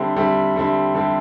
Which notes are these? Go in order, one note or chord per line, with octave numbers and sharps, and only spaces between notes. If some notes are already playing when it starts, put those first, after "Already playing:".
Already playing: D3 G3 C4 E4
D3 G3 C4 E4
D3 G3 C4 E4
D3 G3 C4 E4